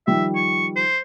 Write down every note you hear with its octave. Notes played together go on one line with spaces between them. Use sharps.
D#3 F3 G3 E5
C#6
C5